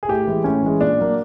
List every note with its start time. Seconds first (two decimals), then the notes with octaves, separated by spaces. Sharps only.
0.03 G#4
0.09 A2 G4
0.27 E3 G#3
0.44 A2 C#4
0.63 E3 G#3
0.81 A#2 D4
0.99 F#3 A#3